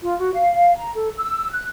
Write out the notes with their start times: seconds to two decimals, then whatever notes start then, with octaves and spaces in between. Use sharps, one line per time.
0.02 F4
0.19 F#4
0.34 F5
0.77 A#5
0.95 A4
1.17 E6
1.51 F#6